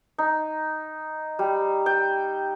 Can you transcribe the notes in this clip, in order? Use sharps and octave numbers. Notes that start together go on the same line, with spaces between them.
D#4
G3
G5